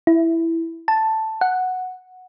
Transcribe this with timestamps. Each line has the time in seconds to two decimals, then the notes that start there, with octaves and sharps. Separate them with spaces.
0.07 E4
0.88 A5
1.41 F#5